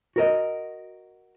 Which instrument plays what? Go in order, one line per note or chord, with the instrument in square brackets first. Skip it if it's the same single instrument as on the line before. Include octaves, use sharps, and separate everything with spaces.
[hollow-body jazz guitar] F#4 A#4 D#5